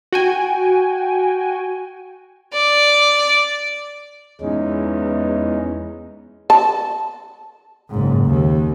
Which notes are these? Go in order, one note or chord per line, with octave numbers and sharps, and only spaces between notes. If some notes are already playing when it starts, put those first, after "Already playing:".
F#4 G5 G#5
D5
E2 G#3 C#4 D#4
A5
F#1 G#2
D#2